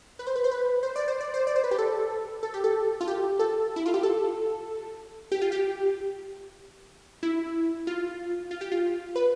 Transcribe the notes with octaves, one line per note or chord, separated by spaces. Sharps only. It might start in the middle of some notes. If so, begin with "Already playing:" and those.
B4
C5
B4
C5
B4
C5
D5
C5
D5
C5
D5
C5
B4
G4
A4
A4
G4
A4
F4
G4
A4
E4
F4
G4
A4
G4
F4
G4
E4
F4
F4
G4
F4
B4